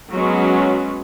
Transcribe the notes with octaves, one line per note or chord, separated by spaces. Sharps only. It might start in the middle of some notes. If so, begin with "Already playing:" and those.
F#3 G#3 B3 C#4